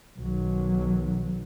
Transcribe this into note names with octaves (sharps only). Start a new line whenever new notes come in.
B1 D#3 F#3